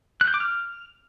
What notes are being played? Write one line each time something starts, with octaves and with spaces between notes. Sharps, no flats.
F#6
G6
D6
F6